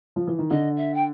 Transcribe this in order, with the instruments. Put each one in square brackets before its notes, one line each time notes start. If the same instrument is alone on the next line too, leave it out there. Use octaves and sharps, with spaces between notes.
[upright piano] F3
E3
D#3
[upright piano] D3 [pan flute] D#5
[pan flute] E5
G5